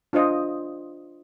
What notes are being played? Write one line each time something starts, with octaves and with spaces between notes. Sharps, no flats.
D4 F4 C5 D#5